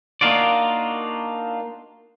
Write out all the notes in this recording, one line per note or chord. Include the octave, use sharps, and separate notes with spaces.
A#3 D4 D#4 F4 F#4 D5